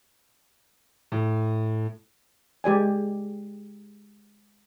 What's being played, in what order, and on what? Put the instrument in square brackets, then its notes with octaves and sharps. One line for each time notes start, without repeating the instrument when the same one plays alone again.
[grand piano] A2
[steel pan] G#3 G4 D5 G#5